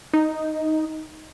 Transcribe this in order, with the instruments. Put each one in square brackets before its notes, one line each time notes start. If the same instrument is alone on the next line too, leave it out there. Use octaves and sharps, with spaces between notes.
[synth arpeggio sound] D#4